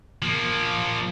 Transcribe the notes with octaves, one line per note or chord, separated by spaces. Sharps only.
F3 A#3